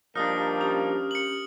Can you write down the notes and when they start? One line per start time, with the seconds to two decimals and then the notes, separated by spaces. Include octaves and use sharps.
0.15 F3 G3 A#3 D4 D#4 D#6 F6
0.61 C#4 G4
1.11 C#7 F#7